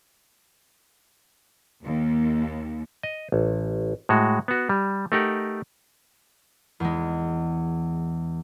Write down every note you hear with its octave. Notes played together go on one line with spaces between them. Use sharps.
D#2
D#5
A1
A2 G#3 F#4
B3 F#4
G3
A3 D#4 G4 A#4 F#5
E2 G#3